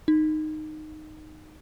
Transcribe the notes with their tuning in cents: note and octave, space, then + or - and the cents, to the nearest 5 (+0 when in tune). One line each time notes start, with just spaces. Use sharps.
D#4 -10